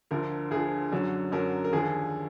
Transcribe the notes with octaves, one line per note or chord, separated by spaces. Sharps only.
D2 D3 F3 A#4
D2 D3 F3 G#4
F#2 D3 F#3
F#2 D3 F#3 A#4
A#4
D#2 D3 F3 G#4